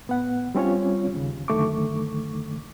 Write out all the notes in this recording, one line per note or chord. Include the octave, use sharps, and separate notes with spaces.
A2 B3 F#5
G3 C4 C#4 F4 C#5
D#2 C#3
F#2 D3 D#3 A3 C#6 D6